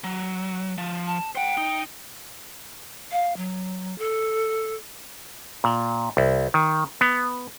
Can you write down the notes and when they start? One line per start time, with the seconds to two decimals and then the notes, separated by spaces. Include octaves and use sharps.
0.04 F#3
0.78 F3
1.07 A5
1.35 C5 F#5 G5
1.57 D#4
3.12 F5
3.37 F#3
3.98 A4
5.64 A#2
6.17 C2
6.54 D#3
7.01 B3